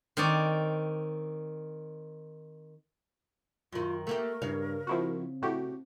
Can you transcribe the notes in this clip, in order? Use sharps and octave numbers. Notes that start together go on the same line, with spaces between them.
D#3 C4 D#4 C#5 D5
F#2 D#3 F4
A3 A#3 G4 A#4
G2 C#3 C#5 F5
F3 C4 E4 F#4
A2 F#4 G4